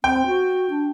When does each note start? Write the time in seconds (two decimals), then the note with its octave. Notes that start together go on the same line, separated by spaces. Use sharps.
0.04 C4 G5
0.27 F#4
0.70 D4